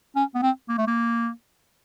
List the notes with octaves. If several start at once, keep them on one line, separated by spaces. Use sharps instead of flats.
C#4
B3
C4
A#3
A3
A#3